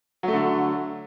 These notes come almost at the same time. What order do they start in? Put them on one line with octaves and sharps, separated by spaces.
F#3 A3 D3